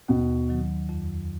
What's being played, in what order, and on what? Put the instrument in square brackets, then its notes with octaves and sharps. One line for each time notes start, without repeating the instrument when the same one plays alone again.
[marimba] D#2 [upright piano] B2
[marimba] D#3 F#3
F2